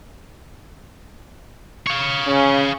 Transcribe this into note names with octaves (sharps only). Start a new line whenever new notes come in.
C#5 F5
C#3 C#4